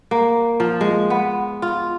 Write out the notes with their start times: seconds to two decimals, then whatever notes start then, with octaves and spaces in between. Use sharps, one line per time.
0.11 A#3
0.60 F3
0.81 G#3
1.10 B3
1.62 F4